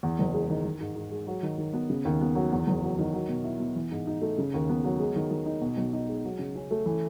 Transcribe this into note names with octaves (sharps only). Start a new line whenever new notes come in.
E2
F#1
G#3
D#3
D#3
G#2
G#2
G#3
F#3
D#3
D#3
B3
C#3
D#2
B3
F#3
E2
F#1
F#3
D#3
F#3
B2
E4
B3
E3
G#2
D#4
A3
C#3
D#2
B3
F#3
G#3
D#3
D#3
D#4
B2
B1
D#4
G#3
F#3
C#3
C#4
A3
E3